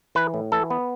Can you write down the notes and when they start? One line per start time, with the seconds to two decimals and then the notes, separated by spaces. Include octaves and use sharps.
0.15 E3 B4
0.34 A2
0.52 E3 A4
0.70 B3